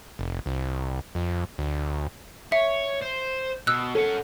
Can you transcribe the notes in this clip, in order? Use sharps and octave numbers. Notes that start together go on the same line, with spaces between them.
F1
C2
F2
D2
C#5 E5
C5
B2 E6 F#6
C#4 A4 F#5